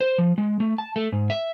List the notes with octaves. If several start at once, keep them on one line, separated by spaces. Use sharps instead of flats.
C5
F3
G#3
A3
A5
A3
G#2
E5